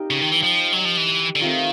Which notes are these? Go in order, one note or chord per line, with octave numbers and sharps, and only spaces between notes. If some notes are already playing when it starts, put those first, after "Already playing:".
Already playing: D#4 G4 A#4 D#5
C#3
D#3
E3
F3
F#3
F3
E3
D3
D#3 A3 C4 F4